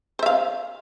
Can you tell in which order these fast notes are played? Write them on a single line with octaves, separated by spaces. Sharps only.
C5 E5 F5